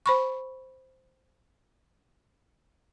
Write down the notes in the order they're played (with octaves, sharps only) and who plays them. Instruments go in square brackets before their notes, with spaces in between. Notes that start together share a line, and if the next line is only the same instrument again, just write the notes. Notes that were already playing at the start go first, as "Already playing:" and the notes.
[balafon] C5 B5 C#6